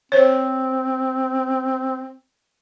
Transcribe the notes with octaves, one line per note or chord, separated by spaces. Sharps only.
C4 C5 C#5